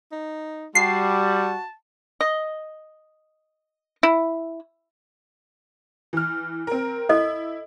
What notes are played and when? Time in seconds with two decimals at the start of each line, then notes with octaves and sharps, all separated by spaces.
0.12 D#4
0.75 G3 F#4 A5 C7
2.21 D#5
4.03 E4
6.13 E3 F6
6.67 C4 A#4
7.09 E4 A4 D#5